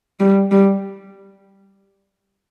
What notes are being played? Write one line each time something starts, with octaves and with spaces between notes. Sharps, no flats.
G3
G3